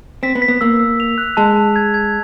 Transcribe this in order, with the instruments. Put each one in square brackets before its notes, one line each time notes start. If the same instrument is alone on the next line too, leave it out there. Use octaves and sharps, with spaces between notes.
[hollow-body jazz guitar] C4 [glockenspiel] B6
[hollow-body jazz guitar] B3
[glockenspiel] B6
[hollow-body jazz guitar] B3
[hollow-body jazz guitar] A#3 [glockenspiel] E6
[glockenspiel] E6
F7
F#6
[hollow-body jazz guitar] G#3 [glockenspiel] A5
[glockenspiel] A5
G#6
G#6